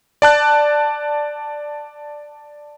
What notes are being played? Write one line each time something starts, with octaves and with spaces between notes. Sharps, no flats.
D5 A5 F#6